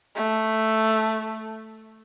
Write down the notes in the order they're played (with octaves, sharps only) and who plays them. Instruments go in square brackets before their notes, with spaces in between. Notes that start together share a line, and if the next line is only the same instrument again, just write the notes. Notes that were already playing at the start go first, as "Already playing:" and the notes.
[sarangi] A3